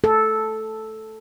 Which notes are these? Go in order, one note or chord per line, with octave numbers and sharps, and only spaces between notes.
A4